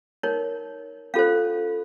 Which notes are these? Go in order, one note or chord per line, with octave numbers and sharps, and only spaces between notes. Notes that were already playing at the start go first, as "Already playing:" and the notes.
D#4 A#4 C#5
C#4 F4 A4 C5 F5